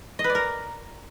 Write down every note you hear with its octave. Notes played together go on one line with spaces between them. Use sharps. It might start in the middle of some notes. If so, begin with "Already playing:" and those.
D#5
B4
D5
A#4